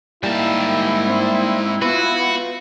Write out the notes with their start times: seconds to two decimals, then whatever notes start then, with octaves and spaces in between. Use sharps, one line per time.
0.23 G#2 G3 A#3 E4 A5
1.07 C4
1.82 B3 F4 F#4 B4